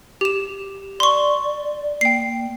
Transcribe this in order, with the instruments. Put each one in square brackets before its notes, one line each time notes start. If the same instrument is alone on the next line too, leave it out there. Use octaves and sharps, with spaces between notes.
[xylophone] G4 E7
[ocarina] D5 [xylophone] C6 C#6
[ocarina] A#3 [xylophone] G5 C7